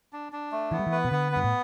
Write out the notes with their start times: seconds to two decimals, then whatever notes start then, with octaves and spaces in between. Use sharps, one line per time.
0.13 D4
0.33 D4
0.52 A3
0.72 E3 B3
0.79 G3
0.87 E3
0.92 B4
1.04 B2
1.11 D3 B3
1.32 G2 B3
1.44 A2